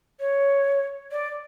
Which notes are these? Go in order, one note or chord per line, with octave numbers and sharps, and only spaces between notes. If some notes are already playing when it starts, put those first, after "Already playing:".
C#5
D5